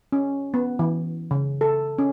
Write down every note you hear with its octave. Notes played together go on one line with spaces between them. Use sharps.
C#4
B3
E3
C#3
A4
C#4